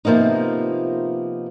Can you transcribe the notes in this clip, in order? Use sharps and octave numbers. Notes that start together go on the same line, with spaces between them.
C3 F3 A#3 B3 D#4